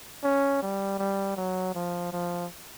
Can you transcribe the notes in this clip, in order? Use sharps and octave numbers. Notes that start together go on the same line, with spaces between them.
C#4
G3
G3
F#3
F3
F3